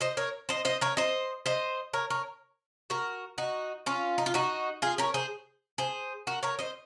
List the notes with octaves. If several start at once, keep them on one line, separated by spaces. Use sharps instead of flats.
C5 D#5
A#4 C#5
C5 D#5
C5 D#5
A#4 C#5
C5 D#5
C5 D#5
A#4 C#5
A#4 C#5
F#4 A#4
D#4 F#4
C#4 F4
D#4
F4
D#4 F#4
F4 G#4
A#4 C#5
G#4 C5
G#4 C5
F#4 A#4
A#4 C#5
C5 D#5